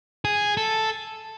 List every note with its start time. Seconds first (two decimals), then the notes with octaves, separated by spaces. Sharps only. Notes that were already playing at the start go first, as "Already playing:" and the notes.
0.25 G#4
0.57 A4